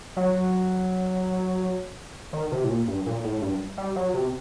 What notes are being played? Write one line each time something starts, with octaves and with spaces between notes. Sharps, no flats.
F#3
D#3
C3
A2
A#2
G2
A#2
A2
G2
G3
F#3
C3